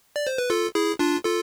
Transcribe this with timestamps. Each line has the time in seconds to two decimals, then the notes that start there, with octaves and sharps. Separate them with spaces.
0.16 D5
0.27 C5
0.38 B4
0.50 F4 A4
0.75 E4 G#4
0.99 D4 F4
1.24 F4 A4